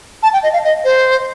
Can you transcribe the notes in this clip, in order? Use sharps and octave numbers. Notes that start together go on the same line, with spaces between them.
A5
G5
D#5
F5
D#5
C5